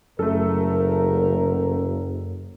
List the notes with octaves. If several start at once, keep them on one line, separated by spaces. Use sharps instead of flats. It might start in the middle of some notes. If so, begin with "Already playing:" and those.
F#1 F#2 A3 A4 A#4